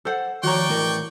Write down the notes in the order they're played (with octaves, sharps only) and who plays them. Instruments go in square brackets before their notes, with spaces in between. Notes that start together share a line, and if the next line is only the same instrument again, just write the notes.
[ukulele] A4 C5 F#5
[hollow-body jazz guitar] D#3 F3 C#5 [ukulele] F#4 A#5 [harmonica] D5 G5 C#6
[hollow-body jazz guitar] A2 E3 A#4